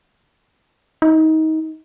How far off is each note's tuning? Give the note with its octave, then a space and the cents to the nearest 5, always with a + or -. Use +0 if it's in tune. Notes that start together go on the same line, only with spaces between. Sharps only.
D#4 +25